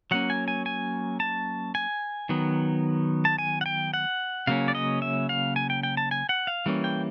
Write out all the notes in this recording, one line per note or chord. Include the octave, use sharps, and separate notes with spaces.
F#3 A#3 C#4 F#5
G#5
G#5
G#5
A5
G#5
D#3 F#3 B3
A5
G#5
F#5
G5
F#5
C#3 F#3 A#3 C#4 F5
D5
D#5
E5
F5
G#5
G5
G5
A5
G#5
F#5
F5
E3 G3 A#3 C#4
G5